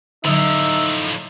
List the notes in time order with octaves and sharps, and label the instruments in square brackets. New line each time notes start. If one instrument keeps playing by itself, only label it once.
[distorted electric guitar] A2 F3 [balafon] D3 F#3 [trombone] D#4 [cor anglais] E5